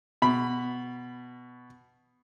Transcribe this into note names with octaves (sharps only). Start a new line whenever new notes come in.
B2 B5